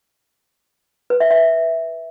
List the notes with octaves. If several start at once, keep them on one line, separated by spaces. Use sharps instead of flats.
B4
E5
E5